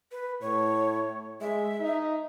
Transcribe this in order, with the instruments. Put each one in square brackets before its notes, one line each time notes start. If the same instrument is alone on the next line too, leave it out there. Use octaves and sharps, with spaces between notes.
[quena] B4
[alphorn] A2 [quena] C#5
[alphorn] G#3 [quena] E5
[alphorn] D#4